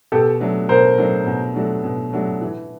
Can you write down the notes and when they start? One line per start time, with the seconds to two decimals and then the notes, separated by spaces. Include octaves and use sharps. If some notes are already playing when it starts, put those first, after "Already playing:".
0.12 B2 G4 A4
0.40 F#3 A3 D4 F#4
0.69 B2 A#4 C5
0.98 F#3 A3 D4 F#4
1.27 B2
1.55 F#3 A3 D4 F#4
1.84 B2
2.13 F#3 A3 D4 F#4
2.41 E3